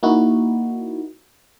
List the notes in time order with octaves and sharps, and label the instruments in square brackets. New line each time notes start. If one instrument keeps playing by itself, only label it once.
[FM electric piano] A#3 D#4 E4 F#4